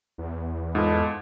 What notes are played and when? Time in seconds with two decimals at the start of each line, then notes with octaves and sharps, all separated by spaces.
0.18 E2
0.75 G#2 F4 A4 B4 D#5